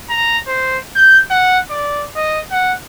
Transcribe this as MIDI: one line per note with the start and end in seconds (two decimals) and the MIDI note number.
0.10 0.38 82
0.48 0.78 72
0.96 1.20 91
1.31 1.59 78
1.71 2.07 74
2.16 2.40 75
2.52 2.74 78